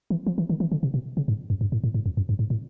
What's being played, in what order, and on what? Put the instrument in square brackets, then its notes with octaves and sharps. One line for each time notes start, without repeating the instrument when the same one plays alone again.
[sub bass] E3
F3
E3
D#3
E3
D3
C3
B2
C#3
G#2
F#2
G2
A2
A2
G#2
F2
F#2
G2
G#2
A2